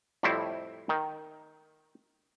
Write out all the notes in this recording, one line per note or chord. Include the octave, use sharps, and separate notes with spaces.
F2 A2 G3 A3 C4 E4
D#3